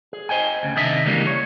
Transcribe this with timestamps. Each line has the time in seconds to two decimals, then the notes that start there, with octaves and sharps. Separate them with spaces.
0.13 G#4
0.29 C5 D#5 G5 G#5
0.63 D2 C#3
0.76 C3 D#3 D4 D#5 E5
1.06 C#3 E3 G3 G#3 A#3
1.27 C#5